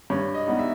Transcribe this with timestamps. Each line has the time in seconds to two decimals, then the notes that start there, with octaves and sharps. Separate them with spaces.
0.10 G2 C#5
0.34 D#5
0.47 G3 B3 D#4
0.59 E5